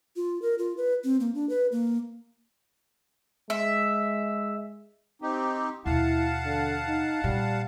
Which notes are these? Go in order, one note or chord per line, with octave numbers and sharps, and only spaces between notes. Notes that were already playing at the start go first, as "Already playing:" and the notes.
F4
A#4
F4
B4
C4
A#3
D4
B4
A#3
G#3 E5
C4 D#4 G4
D#2 B2 E4 F5 F#5 A5
D3
D#4
A#2 G3